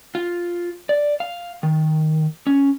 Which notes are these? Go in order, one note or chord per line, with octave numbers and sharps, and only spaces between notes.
F4
D5
F5
D#3
C#4